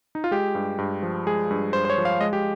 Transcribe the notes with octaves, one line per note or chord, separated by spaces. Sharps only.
D#4
F4
G#3 G4
G2
G2
F3
G#3 G#4
G2
G2 C5
C5
C#5
F3
F5
G#3 D#5
G4